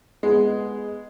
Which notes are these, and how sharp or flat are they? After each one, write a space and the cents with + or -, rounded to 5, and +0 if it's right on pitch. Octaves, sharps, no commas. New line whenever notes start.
G#3 +0 B3 +0